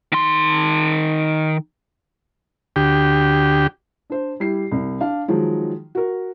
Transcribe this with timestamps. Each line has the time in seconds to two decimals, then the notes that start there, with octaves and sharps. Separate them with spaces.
0.12 D#3 C6
2.76 D2 G4
4.10 D4 C5
4.40 G3 E4 G4 C7
4.72 C2
5.01 D4 F5
5.28 D#3 F3 F#3 G#3
5.95 F#4 A#4